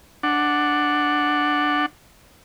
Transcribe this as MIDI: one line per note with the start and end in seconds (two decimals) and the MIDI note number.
0.23 1.86 62
0.23 1.86 78